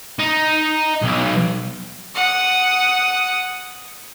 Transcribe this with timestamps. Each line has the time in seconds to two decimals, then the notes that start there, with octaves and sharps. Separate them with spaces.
0.19 D#4
1.03 B1
2.16 F#5 D#6